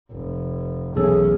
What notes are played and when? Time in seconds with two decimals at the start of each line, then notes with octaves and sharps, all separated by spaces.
0.12 F1
0.96 B1 E2 A3 C#4 G#4 A4